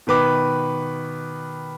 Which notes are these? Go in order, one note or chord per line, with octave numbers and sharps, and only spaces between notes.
B2 D#3 B4 D6